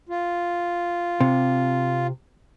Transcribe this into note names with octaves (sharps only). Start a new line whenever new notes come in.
F4
C3